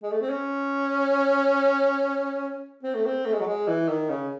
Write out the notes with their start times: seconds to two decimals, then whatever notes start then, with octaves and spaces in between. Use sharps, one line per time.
0.03 G#3
0.12 A3
0.21 C4
0.29 C#4
2.83 C4
2.95 A3
3.06 C4
3.25 A3
3.33 G#3
3.40 F#3
3.46 G#3
3.67 E3
3.89 D#3
4.09 C#3